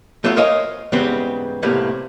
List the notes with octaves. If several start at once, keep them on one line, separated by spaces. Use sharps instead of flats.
F#3 A3 B3 F4 F#4
A#4 C5 C#5 D#5 F5 G#5
E2 G#2 C#3 G3 B3 C4
C2 A2 C3 A#3 B3